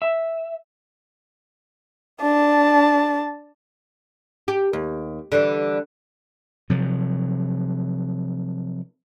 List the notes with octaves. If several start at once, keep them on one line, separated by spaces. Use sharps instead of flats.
E5
D4 A5
G4
D#2
D3 E3 G3
C3 F3 F#3